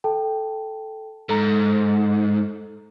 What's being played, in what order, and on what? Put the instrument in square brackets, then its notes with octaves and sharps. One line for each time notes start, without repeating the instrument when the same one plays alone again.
[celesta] A4 G5 A5
[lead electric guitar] G#2 [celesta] A4 A#5